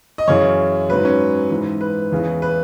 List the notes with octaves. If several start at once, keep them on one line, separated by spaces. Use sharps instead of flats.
D#5
F#2 C#3 E3 C#5
G#2 F#3 B4
C#4
G#2 E3
B4
E2 C#3 E3
B4